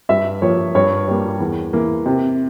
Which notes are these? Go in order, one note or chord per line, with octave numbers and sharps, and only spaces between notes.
G2 E5
F3 A#3 C#5
G2 C#5
G3 A#3
E2
E3 A#3
C3